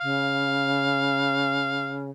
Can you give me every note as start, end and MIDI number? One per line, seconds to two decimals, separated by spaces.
0.01 2.10 49
0.01 2.02 77